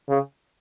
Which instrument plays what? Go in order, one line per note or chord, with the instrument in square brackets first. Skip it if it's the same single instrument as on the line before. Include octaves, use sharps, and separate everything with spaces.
[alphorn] C#3